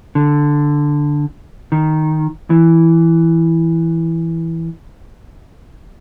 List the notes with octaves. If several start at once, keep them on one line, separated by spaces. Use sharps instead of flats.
D3
D#3
E3